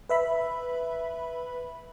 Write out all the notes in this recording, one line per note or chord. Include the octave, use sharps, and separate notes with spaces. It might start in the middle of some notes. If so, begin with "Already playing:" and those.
B4 E5 B5